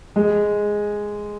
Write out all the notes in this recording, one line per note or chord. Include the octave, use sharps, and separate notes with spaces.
G#3